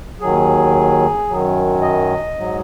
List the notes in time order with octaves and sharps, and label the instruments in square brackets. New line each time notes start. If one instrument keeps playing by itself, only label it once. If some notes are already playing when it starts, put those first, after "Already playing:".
[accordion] D#2 D#3 F#3 G#4
F#2 D#3 F#3
D#5
G#2 F#3